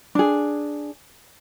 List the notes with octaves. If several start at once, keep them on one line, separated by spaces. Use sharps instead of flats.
D4 G#4